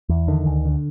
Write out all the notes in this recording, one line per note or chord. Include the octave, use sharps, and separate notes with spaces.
E2
D3 D#3
D2
D3